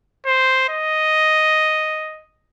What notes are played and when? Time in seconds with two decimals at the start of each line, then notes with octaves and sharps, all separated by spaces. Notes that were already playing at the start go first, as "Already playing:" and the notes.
0.26 C5
0.69 D#5